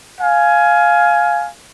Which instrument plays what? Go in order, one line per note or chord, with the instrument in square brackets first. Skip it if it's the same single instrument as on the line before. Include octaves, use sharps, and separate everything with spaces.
[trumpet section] F5 G#5